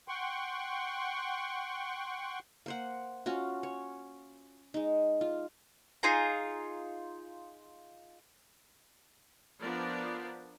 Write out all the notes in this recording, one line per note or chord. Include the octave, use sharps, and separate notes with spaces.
F#5 G5 C6 C#6
A#3 C5 F#5
C#4 F4 F#4
C#5
G#3 D#4
F4
D#4 F4 G#4 A#5
F3 B3 D4 A#4 D5